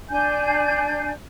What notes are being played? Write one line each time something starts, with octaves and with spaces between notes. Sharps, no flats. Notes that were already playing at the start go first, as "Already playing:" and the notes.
D4 G#5 G6